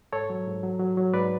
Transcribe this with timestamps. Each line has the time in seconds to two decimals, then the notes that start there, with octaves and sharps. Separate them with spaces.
0.12 G#2 A4 C#5
0.30 F#3
0.47 G#2
0.63 F#3
0.80 F#3
0.97 F#3
1.14 G#2 B4 D5